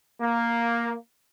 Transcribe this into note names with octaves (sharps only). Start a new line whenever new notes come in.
A#3